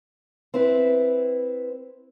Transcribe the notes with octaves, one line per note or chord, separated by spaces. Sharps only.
C4 E4 B4